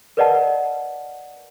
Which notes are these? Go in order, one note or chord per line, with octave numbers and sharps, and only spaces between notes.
A#4 B4 D5 D#5 F#5 A5